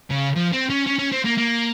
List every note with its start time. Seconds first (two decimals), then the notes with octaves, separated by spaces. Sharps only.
0.10 C#3
0.36 F3
0.52 C4
0.69 C#4
0.86 C#4
0.98 C#4
1.12 C4
1.25 A#3
1.37 A#3